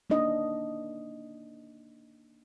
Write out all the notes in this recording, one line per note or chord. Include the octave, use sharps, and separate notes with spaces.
A#3 D4 D#4 D#5